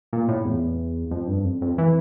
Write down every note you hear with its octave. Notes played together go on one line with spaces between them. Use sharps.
A#2
A2
E2
F2
G2
F2
F2
E3